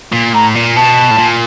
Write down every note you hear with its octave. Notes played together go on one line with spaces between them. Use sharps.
A#2
A2 A#5
A#2
B2 A5
A2
A#2